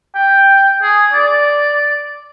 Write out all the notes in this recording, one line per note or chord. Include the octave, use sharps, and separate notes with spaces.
G5
G#4
D5